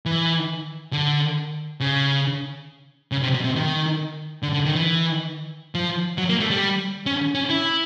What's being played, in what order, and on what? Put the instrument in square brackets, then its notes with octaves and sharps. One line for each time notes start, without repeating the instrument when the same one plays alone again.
[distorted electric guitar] E3
D3
C#3
C#3
C3
B2
C3
D#3
D3
D3
D#3
E3
F3
F#3
A#3
A3
G3
C#4
C#4
E4